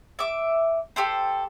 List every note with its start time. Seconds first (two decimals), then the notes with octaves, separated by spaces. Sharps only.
0.19 E5 D6
0.96 G4 A4 C5